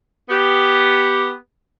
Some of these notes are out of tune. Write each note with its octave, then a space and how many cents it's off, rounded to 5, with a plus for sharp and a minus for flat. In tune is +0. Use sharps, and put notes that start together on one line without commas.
B3 +0 G4 +0